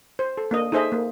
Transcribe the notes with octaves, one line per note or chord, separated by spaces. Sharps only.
C5
A4
A#3 D4 D#5
D#4 G#4 A4 C5 D#5 E5
A#3